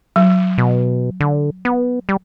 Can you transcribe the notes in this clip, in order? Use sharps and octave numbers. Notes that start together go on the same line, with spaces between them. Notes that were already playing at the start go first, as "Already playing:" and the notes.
F#3
B2
D3
B3
G3